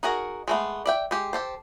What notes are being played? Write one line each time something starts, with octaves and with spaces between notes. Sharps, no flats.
D#4 F#4 G#4 A#4
G#3 A3 B3
D5 E5 G5
G#3 G4
G4 A4 C5